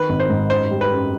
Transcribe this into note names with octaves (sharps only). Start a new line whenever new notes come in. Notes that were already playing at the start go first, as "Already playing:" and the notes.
Already playing: D#3 B4
G#1
C5
G#2
F#2 C5
G3
B4
F#2